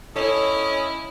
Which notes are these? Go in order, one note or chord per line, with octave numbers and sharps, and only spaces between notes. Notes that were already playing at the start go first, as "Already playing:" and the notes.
C#4 E4 A4 C#5 D#5